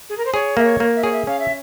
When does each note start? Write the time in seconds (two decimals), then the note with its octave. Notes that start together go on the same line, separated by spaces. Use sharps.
0.09 G#4
0.17 A#4
0.25 C5
0.33 G#4 C#5
0.57 A#3 E5
0.64 C#5
0.80 A#3
0.96 E5
1.03 G#4 C#5
1.12 E5
1.27 C#4 F5
1.39 E5